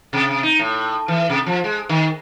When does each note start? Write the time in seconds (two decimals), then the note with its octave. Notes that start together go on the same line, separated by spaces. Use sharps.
0.13 C3
0.43 D#4
0.60 A2
1.08 E3
1.30 C3
1.46 F3
1.64 G#3
1.89 D#3